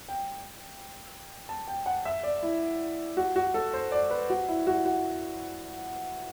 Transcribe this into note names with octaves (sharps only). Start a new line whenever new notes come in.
G5
A5
G5
F#5
E5
D5
E4
F#4
F#4
A4
C5
D5
B4
F#4
E4
F#4
F#4